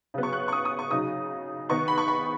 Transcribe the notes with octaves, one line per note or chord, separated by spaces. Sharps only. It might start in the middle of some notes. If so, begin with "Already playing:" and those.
C#3 F#3 B3
C#6
F#6
C#6
D#6
D#6
C#6
C#3 F#3 D#4 D#6
D#3 B3 D#4 C#6
B5
C#6
B5